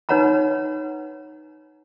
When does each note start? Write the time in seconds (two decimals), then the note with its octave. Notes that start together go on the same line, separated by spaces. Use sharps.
0.09 D#4 B4 C#5 F#5 A#5 B5